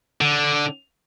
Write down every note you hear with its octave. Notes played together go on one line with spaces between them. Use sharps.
D3